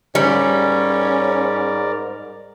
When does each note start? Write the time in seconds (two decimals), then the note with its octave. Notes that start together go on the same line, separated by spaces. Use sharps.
0.15 G#2 G3 C#4 A#4 D5